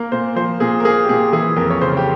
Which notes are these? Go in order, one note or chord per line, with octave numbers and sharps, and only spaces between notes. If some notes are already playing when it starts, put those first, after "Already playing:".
Already playing: A#3 A#4
A#2 C5
F3 C5
A#2 G#4
A#4
A#3 G#4
G4
A#2 G#4
E3 G#4
F2 A#4
C#5
C#3 C5
G4